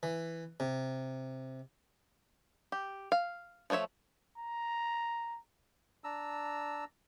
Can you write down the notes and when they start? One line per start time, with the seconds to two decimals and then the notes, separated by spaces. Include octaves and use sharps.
0.03 E3
0.60 C3
2.72 G4
3.12 F5
3.70 F3 A3 F4 C#5 E5
4.38 A#5
6.04 D4 A#5 E6